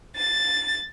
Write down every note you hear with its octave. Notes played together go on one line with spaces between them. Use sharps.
A6